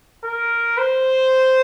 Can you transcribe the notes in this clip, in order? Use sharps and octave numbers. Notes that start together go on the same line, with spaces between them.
A#4
C5